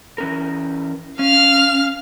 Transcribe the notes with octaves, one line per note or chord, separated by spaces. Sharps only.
E3 C#4 A#4
C#4 F5 F6